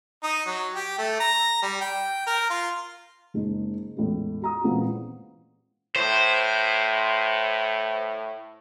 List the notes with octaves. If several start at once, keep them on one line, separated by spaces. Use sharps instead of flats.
D#4
F#3
G4
A3
A#5
G3
G5
A#4
F4
F#1 G#3 D#4
E2 A2 G#3 C#4
F#4 A#5 D#6
A#2 C#3 E3 G#3 B3 C4
A2 C5